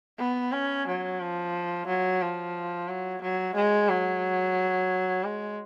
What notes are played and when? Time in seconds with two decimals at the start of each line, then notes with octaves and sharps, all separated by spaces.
0.19 B3
0.52 C#4
0.87 F#3
1.20 F3
1.87 F#3
2.22 F3
2.88 F#3
3.22 F#3
3.55 G#3
3.89 F#3
5.24 G#3